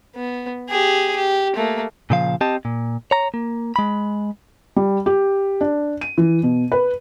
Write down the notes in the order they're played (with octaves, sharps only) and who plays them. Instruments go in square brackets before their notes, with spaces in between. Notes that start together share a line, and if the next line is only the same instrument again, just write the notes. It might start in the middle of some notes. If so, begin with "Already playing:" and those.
[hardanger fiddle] B3
G4 G#4
G4
A3 A#3
[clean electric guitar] A#2 C#3 F3 F5
C4 G4 D#5 A5
A#2
C#5 A#5
A#3
G#3 B5
[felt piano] G3
G4
D4
D#7
E3
B2
B4